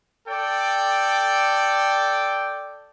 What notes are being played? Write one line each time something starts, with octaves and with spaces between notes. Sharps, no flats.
A4 D5 G5